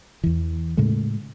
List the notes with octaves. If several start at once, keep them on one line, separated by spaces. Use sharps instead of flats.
E2 E3
A2 C#3 G#3 A3